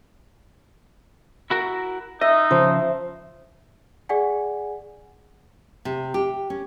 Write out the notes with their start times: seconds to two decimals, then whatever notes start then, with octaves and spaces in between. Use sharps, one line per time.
1.50 E4 F#4 A#4
2.21 D#4 D#5 E5
2.51 C#3 F3 C5
4.09 G#4 D5 F#5 G#5
5.85 C3
6.14 G4
6.50 C#4